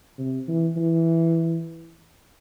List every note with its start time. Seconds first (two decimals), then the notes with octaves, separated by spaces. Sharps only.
0.19 C3
0.48 E3
0.76 E3